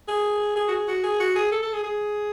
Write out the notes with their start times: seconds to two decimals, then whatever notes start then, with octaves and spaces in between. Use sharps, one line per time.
0.08 G#4
0.56 G#4
0.68 F#4
0.72 G#4
0.88 F#4
1.03 G#4
1.20 F#4
1.35 G#4
1.52 A4
1.62 A4
1.73 G#4
1.83 G#4